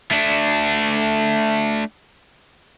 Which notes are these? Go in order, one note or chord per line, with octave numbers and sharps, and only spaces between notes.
A3 D4